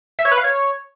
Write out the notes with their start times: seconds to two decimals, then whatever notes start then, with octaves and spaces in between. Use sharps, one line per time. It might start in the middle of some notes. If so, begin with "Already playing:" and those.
0.19 E5
0.25 C#5
0.31 B4
0.38 F5
0.44 C#5